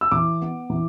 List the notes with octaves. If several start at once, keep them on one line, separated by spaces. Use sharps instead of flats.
E6
E3 D6
B3
E3